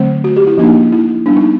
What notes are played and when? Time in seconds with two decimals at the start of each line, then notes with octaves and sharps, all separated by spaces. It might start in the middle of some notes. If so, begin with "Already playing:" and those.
Already playing: D3 F#3 A3 C4
0.24 F#4
0.36 G4
0.47 E4
0.58 F3 A#3 D4 D#4
0.92 E4
1.26 G3 B3 D4
1.37 D#4